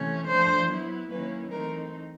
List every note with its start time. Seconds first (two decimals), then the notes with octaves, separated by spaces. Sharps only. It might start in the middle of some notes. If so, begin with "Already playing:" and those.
Already playing: C3 E3 A3 C#4
0.28 F3 A3 D4 C5
0.70 F#3 B3 E4
1.10 D#3 F#3 A#3 C#4 E4 B4
1.51 E3 A3 C4 D#4 A#4